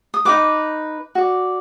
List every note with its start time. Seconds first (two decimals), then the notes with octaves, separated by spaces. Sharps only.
0.14 D#6
0.25 D#4 F#4 B4 D6
1.15 F#4 D5